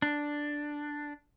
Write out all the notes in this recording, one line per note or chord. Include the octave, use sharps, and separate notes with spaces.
D4